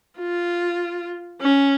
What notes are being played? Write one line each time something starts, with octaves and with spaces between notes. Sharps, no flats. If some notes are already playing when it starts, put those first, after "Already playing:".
F4
C#4